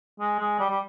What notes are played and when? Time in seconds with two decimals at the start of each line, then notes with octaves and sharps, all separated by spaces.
0.20 G#3
0.39 G#3
0.59 G3
0.70 G3